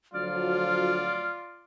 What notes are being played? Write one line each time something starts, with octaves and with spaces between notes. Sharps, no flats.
D2 F3 F#3 F4 D5 F6